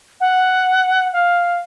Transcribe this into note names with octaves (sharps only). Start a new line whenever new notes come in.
F#5
F5